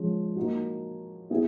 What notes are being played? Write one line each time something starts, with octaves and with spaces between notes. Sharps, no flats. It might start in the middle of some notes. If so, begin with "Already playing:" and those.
Already playing: F3 G#3 C#4
A#3 D#4 F#4
B3 E4 G#4